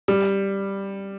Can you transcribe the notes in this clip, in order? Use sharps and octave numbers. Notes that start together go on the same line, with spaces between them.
G3